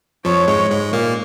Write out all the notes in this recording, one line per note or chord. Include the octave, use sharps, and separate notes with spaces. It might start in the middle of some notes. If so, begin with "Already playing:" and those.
F2 F3 C#5
G#2 G#3
G#2 G#3
A#2 A#3